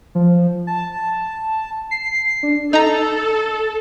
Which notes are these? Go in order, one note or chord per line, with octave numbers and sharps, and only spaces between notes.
F3
A5
C7
D4
D#4 A4 A#5